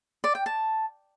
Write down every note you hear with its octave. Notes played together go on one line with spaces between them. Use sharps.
D5
G5
A5